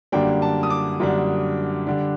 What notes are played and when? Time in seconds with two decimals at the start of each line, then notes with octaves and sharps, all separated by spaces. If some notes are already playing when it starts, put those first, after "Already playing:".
0.12 F#2 D3 G3 A#3 D4 G5
0.42 A5
0.63 D#6
0.70 D6
1.00 F#2 D3 G3 A#3 D4
1.87 D3 G3 D4